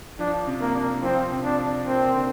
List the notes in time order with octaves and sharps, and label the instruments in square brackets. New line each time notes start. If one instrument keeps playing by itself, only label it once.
[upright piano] F3 [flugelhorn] D4
[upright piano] C3
[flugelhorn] A#3
[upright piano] D4
[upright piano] F3 [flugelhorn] C4
[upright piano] C3
[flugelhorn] D4
[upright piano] D4
[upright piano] A#3 [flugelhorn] C4
[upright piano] D3